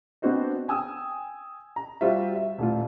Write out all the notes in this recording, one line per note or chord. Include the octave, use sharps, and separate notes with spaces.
B3 C4 D4 F#4 C5 D#5
G5 G#5 D#6 E6
A#5
G3 F4 F#4 C5 E5
E5
D#1 A2 F4